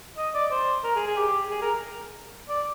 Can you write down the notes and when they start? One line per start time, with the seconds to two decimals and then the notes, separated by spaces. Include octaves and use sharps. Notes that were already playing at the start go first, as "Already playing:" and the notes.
0.18 D#5
0.34 D5
0.51 C5
0.84 A#4
0.96 G#4
1.07 G#4
1.17 G4
1.51 G#4
1.62 A#4
2.49 D5